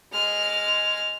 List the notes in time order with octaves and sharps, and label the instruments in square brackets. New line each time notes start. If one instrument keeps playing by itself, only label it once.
[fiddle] G#3 F6